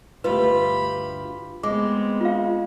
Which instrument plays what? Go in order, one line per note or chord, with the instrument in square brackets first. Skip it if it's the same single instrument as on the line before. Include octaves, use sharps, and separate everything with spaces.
[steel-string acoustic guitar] D2 G2 F4 [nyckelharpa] G4 B5 [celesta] B4
[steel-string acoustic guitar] G#3 [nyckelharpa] B3 C4 [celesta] D6
[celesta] F4 F5